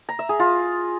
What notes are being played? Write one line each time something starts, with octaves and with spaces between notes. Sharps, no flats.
A#5
E5
G#4
F4